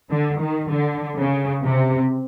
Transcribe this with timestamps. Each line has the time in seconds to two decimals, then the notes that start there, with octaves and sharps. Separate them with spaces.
0.11 D3
0.41 D#3
0.71 D3
1.17 C#3
1.64 C3